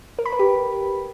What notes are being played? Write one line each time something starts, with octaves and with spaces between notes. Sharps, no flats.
A#4
B5
B4
G4